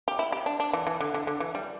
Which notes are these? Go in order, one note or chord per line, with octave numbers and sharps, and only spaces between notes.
G4
E4
G4
D4
D4
E3
E3
D3
D3
D3
E3
G3